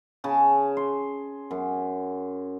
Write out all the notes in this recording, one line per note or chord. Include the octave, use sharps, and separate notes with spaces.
C#3 A5
C6
F#2